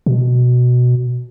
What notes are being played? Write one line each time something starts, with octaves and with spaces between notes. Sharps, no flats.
B2